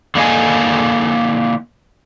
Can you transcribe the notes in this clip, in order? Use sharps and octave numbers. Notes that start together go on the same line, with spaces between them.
D3 A#3 D#5 G#5